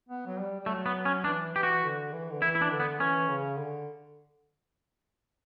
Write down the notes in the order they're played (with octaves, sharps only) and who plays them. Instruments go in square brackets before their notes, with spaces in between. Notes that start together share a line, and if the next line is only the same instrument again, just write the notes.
[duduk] B3
F#3
G3
G3
[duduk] F#3 [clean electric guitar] A3
[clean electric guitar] B3
C#4
[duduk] E3 [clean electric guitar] D4
[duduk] E3 [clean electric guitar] G4
[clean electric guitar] F#4
[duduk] D3
E3
D3
[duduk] E3 [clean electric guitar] E4
[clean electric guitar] E4
D4
[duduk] D3
[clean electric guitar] B3
[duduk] E3 [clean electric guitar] C#4
[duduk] C#3
D3